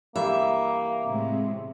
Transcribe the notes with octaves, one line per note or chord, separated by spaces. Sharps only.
G2 E3 A#3 E5
A2 C3 G#3